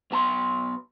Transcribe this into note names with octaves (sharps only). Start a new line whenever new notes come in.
B1 B3 A5 C6